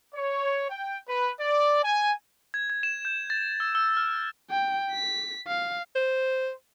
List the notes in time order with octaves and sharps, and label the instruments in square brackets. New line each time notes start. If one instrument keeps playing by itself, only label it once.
[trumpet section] C#5
G5
B4
D5
G#5
[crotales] G#6
G#6
E7
G6
A6
E6
E6
F6
[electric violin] G5
B6
F5
[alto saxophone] C5